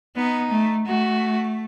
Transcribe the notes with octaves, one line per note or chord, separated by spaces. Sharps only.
B3 D#4
A3
A3 F#4